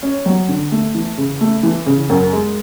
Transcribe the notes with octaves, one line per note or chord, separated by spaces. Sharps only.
C#4
F#3
D3
A3
E3
C#3
A3
E3
C#3
F#2
G#3